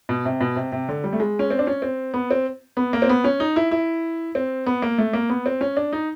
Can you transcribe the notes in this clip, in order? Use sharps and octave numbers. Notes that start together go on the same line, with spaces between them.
B2
C3
B2
C3
C3
D3
G3
A3
G#3
C#4
C4
D4
C#4
C4
B3
C4
B3
A#3
C4
B3
C#4
D#4
E4
E4
C4
B3
A#3
A3
A#3
B3
C4
C#4
D4
D#4